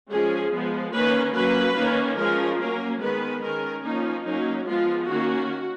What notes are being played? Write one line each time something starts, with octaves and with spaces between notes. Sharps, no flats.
F3 G#3 C#4 G#4
F3 G#3 B3
D#3 A#3 C#4 B4
F#3 A#3 C#4 B4
D#3 A#3 C#4
F3 G#3 C#4 A#4
F#3 A#3 C#4 A#4
D#3 G#3 B3 B4
D#3 G#3 C#4 A#4
F3 A#3 C#4 D#4
F#3 A#3 C#4 D#4
F3 G#3 B3 F4
D#3 A#3 C#4 F#4